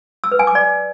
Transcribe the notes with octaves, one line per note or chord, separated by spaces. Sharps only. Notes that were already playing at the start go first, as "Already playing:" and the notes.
E6
B4
G#5
D6
D5